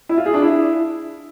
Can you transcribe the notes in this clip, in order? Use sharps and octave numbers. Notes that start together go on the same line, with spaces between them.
E4
F4
G#4
D4
E4